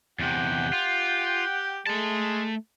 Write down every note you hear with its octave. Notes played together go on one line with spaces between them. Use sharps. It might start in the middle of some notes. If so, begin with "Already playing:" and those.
E2 C3 G4 F#5 G5
F4
G#3 A3 A5